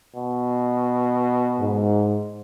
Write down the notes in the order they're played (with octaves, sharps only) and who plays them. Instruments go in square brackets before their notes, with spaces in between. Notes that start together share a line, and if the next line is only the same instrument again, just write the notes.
[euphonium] B2
[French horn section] G#2